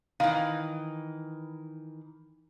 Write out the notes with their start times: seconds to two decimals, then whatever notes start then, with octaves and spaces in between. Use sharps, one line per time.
0.20 D#3 E3 F5